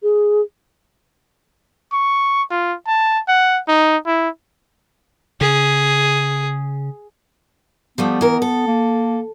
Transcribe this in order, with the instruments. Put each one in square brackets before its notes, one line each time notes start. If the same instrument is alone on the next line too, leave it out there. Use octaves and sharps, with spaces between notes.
[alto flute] G#4
[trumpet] C#6
F4
A5
F#5
D#4
E4
[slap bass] C#3 [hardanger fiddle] G#4
[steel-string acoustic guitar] F3 G3 A3 [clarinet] B3
[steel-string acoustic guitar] E3 A#4
A4
[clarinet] A#3